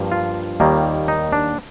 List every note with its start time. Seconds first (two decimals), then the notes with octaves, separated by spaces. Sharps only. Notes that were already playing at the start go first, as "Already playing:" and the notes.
Already playing: G2 F3 A#3
0.12 F4
0.60 D#2 D#3 G3 A#3
1.08 D#4
1.33 D4